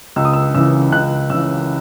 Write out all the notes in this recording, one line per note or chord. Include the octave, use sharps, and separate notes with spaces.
C#2 E6
D#6
E6
C#3 E3 E6
C#2 F#6
C#3 E3 E6